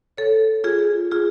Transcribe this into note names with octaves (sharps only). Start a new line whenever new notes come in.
A4 C#5
F4 G#4
F4 G#4